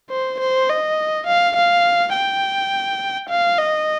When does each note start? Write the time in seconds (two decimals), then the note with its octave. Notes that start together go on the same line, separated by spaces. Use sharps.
0.10 C5
0.40 C5
0.69 D#5
1.27 F5
1.56 F5
2.13 G5
3.30 F5
3.59 D#5